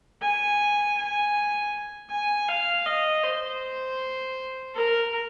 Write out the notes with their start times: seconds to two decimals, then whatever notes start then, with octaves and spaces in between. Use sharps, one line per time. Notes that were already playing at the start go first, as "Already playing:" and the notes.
0.22 G#5
0.98 G#5
2.11 G#5
2.49 F5
2.86 D#5
3.24 C5
4.75 A#4